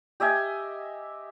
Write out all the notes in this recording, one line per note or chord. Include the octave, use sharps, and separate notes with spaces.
G4 D#5 E5 G#5